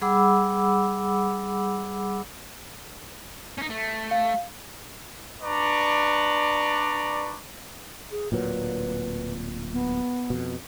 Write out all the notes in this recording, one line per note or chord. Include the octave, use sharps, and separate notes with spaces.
G3 G#4 F#5 B5 D6 E6
C#4 D#4
A3
F5
D4 B4 D5 A#5 C#6
G#4
D1 A#2 F#3 B4
B3
F2 B2